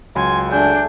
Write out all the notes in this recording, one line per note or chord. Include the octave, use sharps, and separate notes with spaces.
C#2 F#3 G#5 C6
A3 D4 G#4 G6